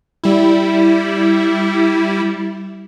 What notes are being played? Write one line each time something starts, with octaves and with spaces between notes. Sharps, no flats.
G3 E4